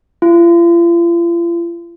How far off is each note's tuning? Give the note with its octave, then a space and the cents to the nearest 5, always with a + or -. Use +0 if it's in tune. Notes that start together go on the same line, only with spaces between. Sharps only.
F4 -40